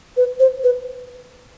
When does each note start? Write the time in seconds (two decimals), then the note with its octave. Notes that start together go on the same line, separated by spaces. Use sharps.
0.17 B4
0.40 C5
0.64 B4